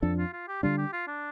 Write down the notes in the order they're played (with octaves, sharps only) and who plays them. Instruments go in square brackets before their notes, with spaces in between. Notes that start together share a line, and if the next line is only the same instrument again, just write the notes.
[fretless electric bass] F2 F3 D4 [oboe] A4
[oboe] F4
F4
G4
[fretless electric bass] D3 G3 D4 [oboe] F4
[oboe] G4
F4
D4